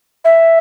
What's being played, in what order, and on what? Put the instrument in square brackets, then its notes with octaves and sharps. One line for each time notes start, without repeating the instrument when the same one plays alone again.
[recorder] E5